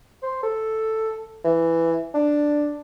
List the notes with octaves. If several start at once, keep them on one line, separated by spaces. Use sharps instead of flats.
C5
A4
E3
D4